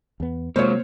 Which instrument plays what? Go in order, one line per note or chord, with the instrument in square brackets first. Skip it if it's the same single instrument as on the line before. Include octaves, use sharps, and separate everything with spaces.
[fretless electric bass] E2 B3
[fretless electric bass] C3 [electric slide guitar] F#3 G#3 F4 [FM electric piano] A#3 [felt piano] C5 C#5